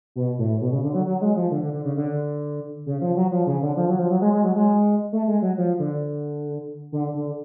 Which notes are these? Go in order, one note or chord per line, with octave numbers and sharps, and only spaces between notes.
B2
A2
B2
C#3
D3
F#3
F#3
G#3
F3
D3
D3
D3
C#3
D3
C#3
F3
F#3
F3
C#3
D3
F3
F#3
F3
F#3
G#3
G#3
F#3
G#3
A3
G#3
F#3
F3
D3
D3
D3